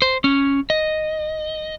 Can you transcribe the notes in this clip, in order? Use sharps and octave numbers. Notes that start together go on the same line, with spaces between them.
C5
C#4
D#5